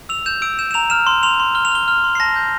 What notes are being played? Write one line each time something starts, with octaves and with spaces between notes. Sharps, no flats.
E6 F7
G6 E7
E6 D7
G6 E7
E7
A#5 F7
F6 E7
C6
C6 F7
C6
F6 G7
F7
F6 G7
F6 F7
C6
C7
A5 A#6
G6